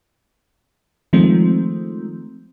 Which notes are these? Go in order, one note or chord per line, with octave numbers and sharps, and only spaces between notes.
D#3 F3 G#3 A3 C4